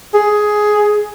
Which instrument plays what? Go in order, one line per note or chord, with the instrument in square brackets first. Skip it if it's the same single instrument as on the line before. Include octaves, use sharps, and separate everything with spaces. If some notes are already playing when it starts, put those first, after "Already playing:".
[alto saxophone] G#4